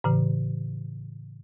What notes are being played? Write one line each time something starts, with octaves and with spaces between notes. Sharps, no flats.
A2 C#3 E3